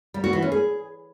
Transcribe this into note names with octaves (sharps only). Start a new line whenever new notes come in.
G3
F#4
E3
C#4
G#4